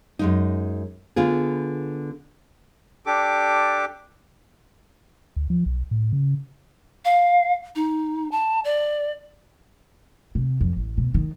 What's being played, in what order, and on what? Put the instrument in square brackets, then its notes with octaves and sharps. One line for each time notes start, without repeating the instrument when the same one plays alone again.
[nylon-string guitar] F#2 G#3 D#4
D3 B3 F4 G#4
[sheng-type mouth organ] D4 G4 A4 D6
[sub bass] D2
F3
B1
A2
C#3
[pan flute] F5
D#4
A5
D5
[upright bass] C3
F2
A1
B2
D#3